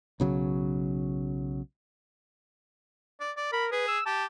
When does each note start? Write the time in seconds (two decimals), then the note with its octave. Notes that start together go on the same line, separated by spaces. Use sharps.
0.20 B1 C#3 F#3
3.20 D5
3.37 D5
3.53 A#4 B5
3.72 G#4 B4
3.88 E6
4.06 G4 A5